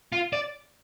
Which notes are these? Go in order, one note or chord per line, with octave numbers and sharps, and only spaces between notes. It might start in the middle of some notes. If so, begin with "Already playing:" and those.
F4
D5